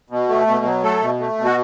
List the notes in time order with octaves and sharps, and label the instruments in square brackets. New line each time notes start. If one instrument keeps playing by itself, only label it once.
[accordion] B2
A3
B2
F#3
A3 A4
B2
A3
B2
F#4